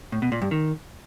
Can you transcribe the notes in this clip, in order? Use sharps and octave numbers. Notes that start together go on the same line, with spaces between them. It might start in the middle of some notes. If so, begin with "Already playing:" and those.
A2
B2
A#2
G2
D#3